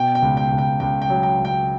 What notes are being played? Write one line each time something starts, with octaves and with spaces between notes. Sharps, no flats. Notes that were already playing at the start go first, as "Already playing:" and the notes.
Already playing: B2 G5
G5
C#2
G5
C#2
G5
C#2 G5
G5
F#3
G5
C#2
G5